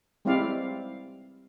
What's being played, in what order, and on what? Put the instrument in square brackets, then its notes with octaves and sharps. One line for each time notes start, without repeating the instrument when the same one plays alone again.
[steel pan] G3 G#3 C4 E4 D5 F5